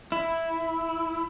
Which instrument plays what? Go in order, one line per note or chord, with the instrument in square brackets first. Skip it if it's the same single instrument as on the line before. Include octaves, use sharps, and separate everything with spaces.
[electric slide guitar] E4